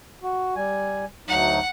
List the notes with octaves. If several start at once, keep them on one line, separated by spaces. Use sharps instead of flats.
F#4
G3 G#5
D2 F#3 D#4 F#5